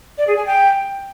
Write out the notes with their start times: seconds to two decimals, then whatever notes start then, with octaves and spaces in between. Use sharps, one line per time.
0.18 D5
0.27 G#4
0.37 G#5
0.46 G5